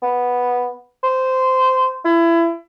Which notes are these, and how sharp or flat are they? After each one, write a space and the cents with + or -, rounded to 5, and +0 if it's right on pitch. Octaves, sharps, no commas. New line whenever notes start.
B3 -5
C5 -15
E4 +25